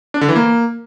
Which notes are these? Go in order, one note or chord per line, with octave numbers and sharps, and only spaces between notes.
D4
D3
E3
A#3